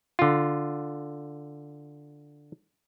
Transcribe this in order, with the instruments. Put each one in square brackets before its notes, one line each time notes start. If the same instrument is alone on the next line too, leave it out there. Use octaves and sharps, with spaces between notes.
[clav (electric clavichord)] D3 F4